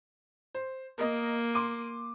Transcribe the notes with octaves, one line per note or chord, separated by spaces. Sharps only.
C5
A#3 A#4 D#5
C6 D6 D#7